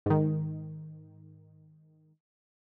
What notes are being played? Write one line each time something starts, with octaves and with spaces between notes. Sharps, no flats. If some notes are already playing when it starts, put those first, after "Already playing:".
G#2 D#3